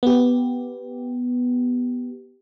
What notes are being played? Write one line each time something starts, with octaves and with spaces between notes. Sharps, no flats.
B3 G4